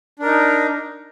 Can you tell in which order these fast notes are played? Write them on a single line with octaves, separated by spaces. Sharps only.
D4 A#4 D#4